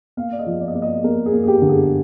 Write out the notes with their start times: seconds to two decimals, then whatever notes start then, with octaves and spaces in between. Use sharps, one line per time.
0.17 A#3 F5
0.32 D5
0.39 D#5
0.46 F3
0.61 D5
0.68 D#5
0.75 A#3 D5
0.82 D#5
1.04 A#3 A#4
1.26 G#4
1.33 A#3
1.43 G#4
1.47 G4
1.62 D3
1.69 G#4